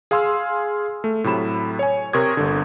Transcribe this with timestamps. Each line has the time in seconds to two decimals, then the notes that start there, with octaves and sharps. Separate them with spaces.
0.11 G#4 F5 G#5 C6 E6 F6
1.04 A3
1.24 A2 C3 F#3 B5 E7
1.79 C#5 G#5
2.13 C3 A#4 C6 C#6 D#6 G#6
2.37 G1 D3